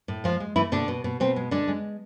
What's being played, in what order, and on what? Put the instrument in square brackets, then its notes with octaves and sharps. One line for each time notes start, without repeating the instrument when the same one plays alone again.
[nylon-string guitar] A2
F3 G#3 F4
G#3
E3 A3 E4
B2 D3 D4
B2
B2
B2 C4
G#3
D3 G#3 D4
G#3